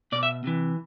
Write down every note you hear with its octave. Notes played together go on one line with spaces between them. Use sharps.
B2 D5
E5
C3 E3